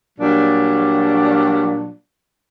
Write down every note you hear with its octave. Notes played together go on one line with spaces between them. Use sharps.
A#2 F#3 G3 D4